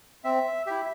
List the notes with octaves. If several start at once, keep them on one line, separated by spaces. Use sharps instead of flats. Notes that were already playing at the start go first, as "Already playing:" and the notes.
C4 E5
E4 G4 E5